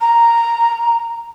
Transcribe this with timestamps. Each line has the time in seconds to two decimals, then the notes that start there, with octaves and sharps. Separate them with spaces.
0.01 A#5